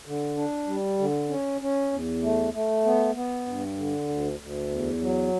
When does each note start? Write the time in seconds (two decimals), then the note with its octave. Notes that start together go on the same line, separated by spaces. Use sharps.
0.06 D3
0.37 D4
0.67 G3
0.99 D3
1.29 C#4
1.61 C#4
1.92 E2
2.22 A3
2.53 A3
2.85 B3
3.15 B3
3.46 G2
3.77 D3
4.09 D2
4.39 D2
4.70 E2
5.01 F#3